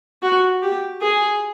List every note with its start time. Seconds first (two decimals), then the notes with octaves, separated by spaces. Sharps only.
0.23 F#4
0.62 G4
1.01 G#4